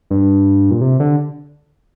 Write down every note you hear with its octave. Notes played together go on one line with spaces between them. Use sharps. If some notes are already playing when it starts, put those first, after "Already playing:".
G2
A#2
C3
D3